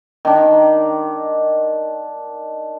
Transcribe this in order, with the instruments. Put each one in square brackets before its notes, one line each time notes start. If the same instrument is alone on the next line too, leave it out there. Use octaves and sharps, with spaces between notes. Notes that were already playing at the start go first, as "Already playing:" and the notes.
[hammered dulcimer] D#3 D4